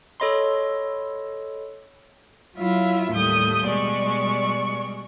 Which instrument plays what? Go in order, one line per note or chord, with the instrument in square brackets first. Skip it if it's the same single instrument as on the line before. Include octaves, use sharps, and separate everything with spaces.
[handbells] A4 C#5 D#5 B5 C6
[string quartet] F#3 E4 F4 E5
D#2 A2 G3 A3 D#6 G6
B2 G3 G#3 D5 C#6